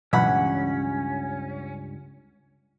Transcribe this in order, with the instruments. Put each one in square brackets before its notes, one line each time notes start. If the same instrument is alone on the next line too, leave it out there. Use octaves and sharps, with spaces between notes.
[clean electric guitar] C#2 G2 [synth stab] B2 E3 F#3 [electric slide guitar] C#4 [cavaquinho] F#5 B5